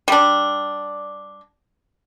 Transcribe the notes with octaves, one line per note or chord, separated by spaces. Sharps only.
G3 D4